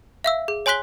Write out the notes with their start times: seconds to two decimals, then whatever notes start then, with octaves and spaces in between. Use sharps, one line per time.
0.24 E5 F5 E6
0.48 G#4
0.66 C#5 G#5 C6 F#6 B6 G7